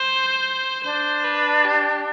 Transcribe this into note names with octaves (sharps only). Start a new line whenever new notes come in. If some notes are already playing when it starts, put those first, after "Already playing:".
Already playing: C5
D4 C5
B4
G4